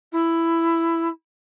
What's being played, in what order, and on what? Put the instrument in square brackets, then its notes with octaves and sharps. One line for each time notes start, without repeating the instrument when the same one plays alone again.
[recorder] E4